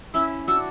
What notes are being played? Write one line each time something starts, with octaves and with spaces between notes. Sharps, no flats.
C#4 E4 E6
D4 F#4 E6